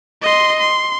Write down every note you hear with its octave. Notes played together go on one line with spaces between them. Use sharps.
D#5 C6
C6